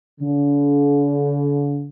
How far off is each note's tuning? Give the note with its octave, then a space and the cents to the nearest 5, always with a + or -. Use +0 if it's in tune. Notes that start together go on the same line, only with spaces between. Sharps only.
D3 -45